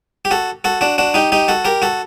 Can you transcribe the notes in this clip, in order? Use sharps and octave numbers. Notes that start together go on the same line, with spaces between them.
G4
F#4 A4
F#4 A4
D4 F#4
D4 F#4
D#4 G4
D#4 G4
F#4 A4
G4 A#4
F#4 A4